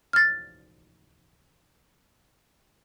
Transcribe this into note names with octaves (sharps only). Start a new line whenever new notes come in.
F6 A6